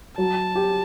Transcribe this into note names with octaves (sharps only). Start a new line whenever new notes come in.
F#3 A5
G4